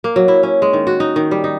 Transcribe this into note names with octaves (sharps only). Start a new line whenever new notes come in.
A#3
F#3
E4
C#4
G#3
D#3
F#4
D#4
D#3
G3
D#4